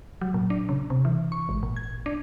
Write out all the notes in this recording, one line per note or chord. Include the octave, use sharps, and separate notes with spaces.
F#3
A#2
D4
C#3
C3
E3
C#6
G#1
A#2
G#6
D4